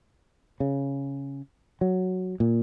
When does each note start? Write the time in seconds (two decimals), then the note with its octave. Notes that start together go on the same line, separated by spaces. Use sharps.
0.60 C#3
1.81 F#3
2.40 A#2